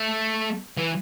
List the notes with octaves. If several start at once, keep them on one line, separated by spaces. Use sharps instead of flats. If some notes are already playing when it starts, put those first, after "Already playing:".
Already playing: A3
E3